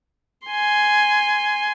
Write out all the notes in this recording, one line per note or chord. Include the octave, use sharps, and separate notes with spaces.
G#5 C6